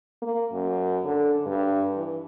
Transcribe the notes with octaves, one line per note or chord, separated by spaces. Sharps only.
A#3
F#2
D3
G2
E3